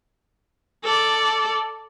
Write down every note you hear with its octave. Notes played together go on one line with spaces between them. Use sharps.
A4 D5